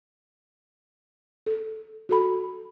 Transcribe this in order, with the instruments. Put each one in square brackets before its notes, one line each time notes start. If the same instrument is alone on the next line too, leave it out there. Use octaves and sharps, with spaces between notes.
[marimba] A4
F#4 A4 B5